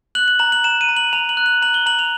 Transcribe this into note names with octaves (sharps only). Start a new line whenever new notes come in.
F#6 F#7
F#7
A#5 F#7
F#7
A#5 E7
D#7
A#5
F#7
A#5 F7
F#7
F#6
F#7
A#5 F#7
G7
A#5 F#7
F7